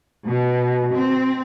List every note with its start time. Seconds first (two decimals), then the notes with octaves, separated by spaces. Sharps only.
0.28 B2
0.95 C4